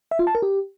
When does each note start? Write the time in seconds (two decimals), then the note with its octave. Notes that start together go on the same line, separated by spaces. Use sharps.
0.11 E5
0.19 F4
0.27 A5
0.35 A#4
0.42 G4